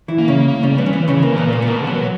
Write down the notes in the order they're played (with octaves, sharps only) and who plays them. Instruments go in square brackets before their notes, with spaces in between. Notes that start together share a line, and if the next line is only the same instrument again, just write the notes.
[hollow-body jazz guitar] E3 E4
[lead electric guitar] A#3
[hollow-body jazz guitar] C#3 C#4
[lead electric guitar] A#3
[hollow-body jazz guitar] C#3 C#4 [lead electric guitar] G3
[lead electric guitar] E3 [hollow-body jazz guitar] B3
[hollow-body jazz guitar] C#4
[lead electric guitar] E3 [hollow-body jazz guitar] B3
[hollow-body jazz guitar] C#3 C#4 [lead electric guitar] E3
[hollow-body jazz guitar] A#3
[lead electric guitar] A#2 [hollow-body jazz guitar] B3
[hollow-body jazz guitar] A#3
B3
[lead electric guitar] B2 [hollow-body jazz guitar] A#3
[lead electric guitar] F#3 [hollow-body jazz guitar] B3